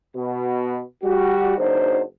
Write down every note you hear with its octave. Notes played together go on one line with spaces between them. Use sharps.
B2
G3 F#4
F#1 F#3 D4 D#4 C5